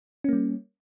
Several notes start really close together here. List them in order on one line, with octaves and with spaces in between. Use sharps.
C#4 A#3 G3